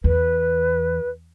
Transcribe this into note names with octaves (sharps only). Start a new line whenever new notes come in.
E2 B4